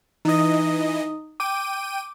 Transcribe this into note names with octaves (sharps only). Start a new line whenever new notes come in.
E3 D#4 D#5 D#6
G5 D6 D#7